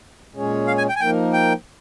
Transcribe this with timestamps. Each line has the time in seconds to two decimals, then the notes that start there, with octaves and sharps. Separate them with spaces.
0.34 A#2 G#3 C#4 G#4 C#5
0.67 F5
0.78 G#5
0.89 G5
0.95 G#5
1.00 F3 A#3 D#4 A#4 G5
1.33 G5